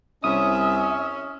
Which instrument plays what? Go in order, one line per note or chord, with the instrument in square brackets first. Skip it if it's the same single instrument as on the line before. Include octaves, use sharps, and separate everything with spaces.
[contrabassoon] C2 [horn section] C#4 [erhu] E5 [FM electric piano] D#6